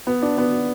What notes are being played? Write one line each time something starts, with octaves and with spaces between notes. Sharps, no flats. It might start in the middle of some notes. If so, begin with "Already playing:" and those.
B3
D4
B3